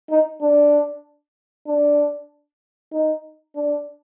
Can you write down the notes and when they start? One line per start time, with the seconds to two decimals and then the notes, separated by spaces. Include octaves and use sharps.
0.10 D#4
0.41 D4
1.67 D4
2.93 D#4
3.56 D4